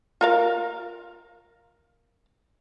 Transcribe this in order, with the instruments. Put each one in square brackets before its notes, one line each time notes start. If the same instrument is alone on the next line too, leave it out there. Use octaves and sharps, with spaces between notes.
[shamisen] F4 A#4 F5